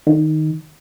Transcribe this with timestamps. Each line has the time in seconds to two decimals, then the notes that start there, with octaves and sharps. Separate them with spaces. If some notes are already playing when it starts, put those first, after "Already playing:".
0.07 D#3